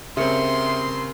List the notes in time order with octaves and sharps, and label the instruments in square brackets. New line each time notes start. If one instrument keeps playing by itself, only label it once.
[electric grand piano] C#3 C4 [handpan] G4 A#4 [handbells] E5 C#7 [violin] C6